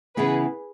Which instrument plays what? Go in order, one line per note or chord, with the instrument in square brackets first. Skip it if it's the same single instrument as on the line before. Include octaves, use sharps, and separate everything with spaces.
[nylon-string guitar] C#3 E3 B3 [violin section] G#4 B4